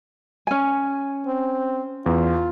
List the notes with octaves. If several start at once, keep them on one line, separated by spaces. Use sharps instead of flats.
C#4 G#5
C4
E2 F4